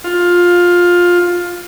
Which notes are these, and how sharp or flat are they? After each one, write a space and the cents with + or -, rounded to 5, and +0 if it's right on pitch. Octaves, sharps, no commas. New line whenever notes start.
F4 +15